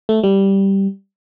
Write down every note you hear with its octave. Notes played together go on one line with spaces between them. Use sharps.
A3
G3